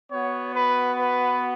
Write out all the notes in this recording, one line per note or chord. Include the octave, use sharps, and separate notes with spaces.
B3 F#4 C#5
B4
B4